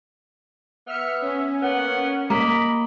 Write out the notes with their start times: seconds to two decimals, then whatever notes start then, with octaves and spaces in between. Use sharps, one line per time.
0.87 B3 E5 F6 C#7
1.22 C#4
1.62 A#3 B3 F#5
2.30 A#3 A#4 D#5 B5